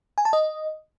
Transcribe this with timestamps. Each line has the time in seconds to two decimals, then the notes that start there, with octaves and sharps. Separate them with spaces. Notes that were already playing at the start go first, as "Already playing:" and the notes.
0.18 G#5
0.25 A5
0.33 D#5